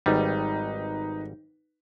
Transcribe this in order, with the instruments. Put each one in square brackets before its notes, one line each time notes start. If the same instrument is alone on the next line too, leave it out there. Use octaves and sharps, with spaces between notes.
[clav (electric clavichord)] G#1 G3 [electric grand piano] D#4 B4